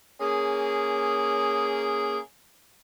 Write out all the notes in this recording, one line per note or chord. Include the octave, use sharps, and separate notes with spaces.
A#3 C#4 G#4